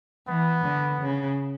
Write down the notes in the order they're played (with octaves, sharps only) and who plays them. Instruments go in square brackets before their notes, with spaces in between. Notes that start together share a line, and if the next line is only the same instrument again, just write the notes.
[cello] E3 [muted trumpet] B3
[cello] D3
C#3